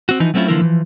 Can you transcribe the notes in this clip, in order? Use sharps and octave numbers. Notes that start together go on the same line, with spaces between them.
C4 F#4
E3 F3 D#4
F#3 A3 C4 C#4 E4 F4
D3 E3 F3 A#3 E4 A#4
E3 F3